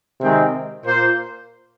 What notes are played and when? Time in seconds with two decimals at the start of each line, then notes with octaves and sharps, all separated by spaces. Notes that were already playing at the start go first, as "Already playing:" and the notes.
0.21 C3 D#3 G#3 C4
0.83 A#2 A#3 F4 C5